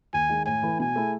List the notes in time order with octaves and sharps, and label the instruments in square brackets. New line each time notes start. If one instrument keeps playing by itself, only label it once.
[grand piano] D#2 [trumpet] G#5
[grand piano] D#3 G#3
[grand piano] A2 [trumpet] G#5
[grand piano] E3 A3 E4 B4
[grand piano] B2 [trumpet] G#5
[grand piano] A3 E4 G#4